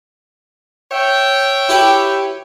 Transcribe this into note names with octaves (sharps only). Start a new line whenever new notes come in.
C#5 E5 G5
E4 G4 B4